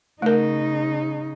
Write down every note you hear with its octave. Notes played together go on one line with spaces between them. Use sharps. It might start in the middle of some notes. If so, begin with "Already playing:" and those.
C#3 A3 D#4 A#4